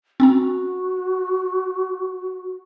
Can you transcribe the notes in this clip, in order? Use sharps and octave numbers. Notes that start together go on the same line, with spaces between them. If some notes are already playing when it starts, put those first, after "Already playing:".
C4 C#4 F#4 A#5